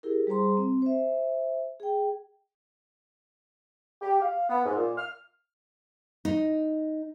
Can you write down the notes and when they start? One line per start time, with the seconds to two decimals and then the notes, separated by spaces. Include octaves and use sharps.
0.03 E4 G4 G#4 A#4
0.27 G3 G#4 C5 A#5 C6
0.57 C4
0.82 C5 E5
1.80 G#4 G5
4.02 G4
4.22 F5
4.49 B3
4.65 G#2
4.76 A#2
4.97 F6
6.25 D#4